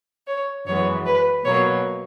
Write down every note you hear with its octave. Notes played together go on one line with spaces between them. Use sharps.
C#5
F#2 E3 G#3 B3 C#5
B4
B2 F#3 A#3 C#5